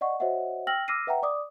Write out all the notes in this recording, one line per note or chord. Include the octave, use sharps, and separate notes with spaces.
D5 D#5 F#5 C#6
F#4 C5 C#5 D#5 E5 F#5
G5 E6 F6 A#6 F#7
D6 E6 F6 A#6 C7 D#7
B4 E5 F#5 G5 A#5
D5 D6 D#6